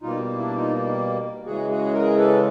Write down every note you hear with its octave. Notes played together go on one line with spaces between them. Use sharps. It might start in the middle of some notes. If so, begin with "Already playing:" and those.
B2 G3 A#3 D#4 F4
D4 E4
D#4 F4
C#3 E3 G#3 F#4 G#4
F#4 G#4
G#4 A#4
A4 B4